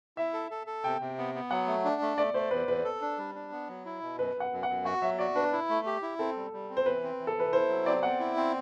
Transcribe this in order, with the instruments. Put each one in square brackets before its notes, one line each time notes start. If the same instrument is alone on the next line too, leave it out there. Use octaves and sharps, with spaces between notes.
[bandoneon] E4 [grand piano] E5
[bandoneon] A4
A4
A4
[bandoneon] C3 [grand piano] G5
[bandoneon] C3
B3
B3
[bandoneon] F#3 [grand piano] F#5
[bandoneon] A3
D4
A3
[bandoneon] A3 [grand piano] D5
[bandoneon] A3 [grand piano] C5
[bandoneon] E2 [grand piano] B4
[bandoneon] E2 [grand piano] B4
[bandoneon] A4
D4
G3
D4
B3
F#3
E4
B2
[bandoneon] F#2 [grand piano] B4
[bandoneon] F#2
[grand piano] F#5
[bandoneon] F#2
[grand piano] F#5
[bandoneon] F#2
[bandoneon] F#4 [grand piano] F#5
[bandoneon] F#3 [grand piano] E5
[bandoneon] F#4 [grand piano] D5
[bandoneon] D4 [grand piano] B4
[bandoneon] E4
A3
G4
E4
[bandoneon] C4 [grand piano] A4
[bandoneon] G3
G3
C4
[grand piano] C5
[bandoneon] E3 [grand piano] B4
[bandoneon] C4
E3
[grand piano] A4
[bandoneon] E3 [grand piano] B4
[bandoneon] E4 [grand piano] C5
[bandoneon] F#3
[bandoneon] C4 [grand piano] D5
[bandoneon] C4 [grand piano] F#5
[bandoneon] E4
C4